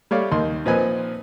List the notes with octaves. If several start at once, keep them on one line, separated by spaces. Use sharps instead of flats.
G3 A3 C#5 D5 F5
D#2 D#3 C6
A#2 F3 C4 D#4 B4 G#5